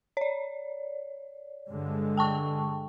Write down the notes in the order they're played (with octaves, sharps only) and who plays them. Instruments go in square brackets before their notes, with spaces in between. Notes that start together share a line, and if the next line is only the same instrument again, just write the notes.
[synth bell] C#5 D5
[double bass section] G2 D3 G#3
[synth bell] G5 A5 C#6